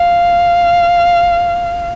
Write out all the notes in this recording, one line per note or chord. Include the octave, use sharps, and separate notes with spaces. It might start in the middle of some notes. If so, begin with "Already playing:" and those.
Already playing: F5